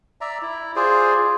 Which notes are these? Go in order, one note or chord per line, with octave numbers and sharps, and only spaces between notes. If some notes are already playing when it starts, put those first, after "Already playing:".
D5 E5 A#5
E4
F4 G#4 C5 D5